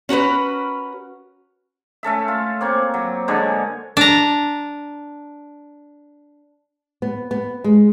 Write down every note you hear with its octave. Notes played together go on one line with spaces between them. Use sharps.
C#4 F#4 A#4 B4
A3 C#4 A4 E5
F4
A#3 C4 C#5
F#3
D3 G#3 D4 C#5
D4 A#5
B3
B3
G#3